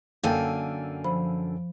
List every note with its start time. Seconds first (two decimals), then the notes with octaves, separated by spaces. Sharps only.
0.23 F#2 D3 A#3 A4 G5 G#5
1.04 F3 C5 B5